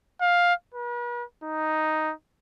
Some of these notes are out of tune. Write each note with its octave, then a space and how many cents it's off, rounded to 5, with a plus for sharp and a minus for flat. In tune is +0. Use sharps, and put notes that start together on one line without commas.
F5 +10
B4 -45
D#4 +0